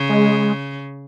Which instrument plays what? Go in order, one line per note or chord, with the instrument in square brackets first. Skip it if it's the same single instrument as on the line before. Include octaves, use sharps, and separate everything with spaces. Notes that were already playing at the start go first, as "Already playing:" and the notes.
Already playing: [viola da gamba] C#3
[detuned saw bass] G#3